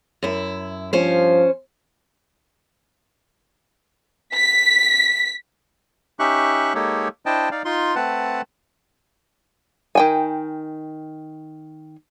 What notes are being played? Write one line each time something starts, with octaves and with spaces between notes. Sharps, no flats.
F#2 E4
G2 F3 C#4 C5
B6
C#4 D#4 G4 E5 C#6 F#6
G#3 A#3 D#4 G4 A4 C#5
D4 E4 C5 D#5 G5 A5
D#4 D5 F5
D#4 F4 C6
A3 C4 B4 F#5 A5
D#3 G5 G#5